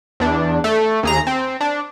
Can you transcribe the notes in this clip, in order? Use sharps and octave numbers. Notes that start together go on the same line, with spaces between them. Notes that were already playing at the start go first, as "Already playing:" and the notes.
E2 D4
A3
D#2 G#4 A#5
C4
D4